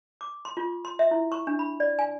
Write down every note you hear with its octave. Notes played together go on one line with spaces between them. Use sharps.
D6
C6
F4
C6
E5
E4
C#6
D4
B5
D5
G#5